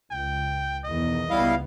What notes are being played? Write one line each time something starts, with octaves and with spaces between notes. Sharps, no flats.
C#2 G5
B1 E2 D#3 D#5
C#2 G3 B3 E4 F5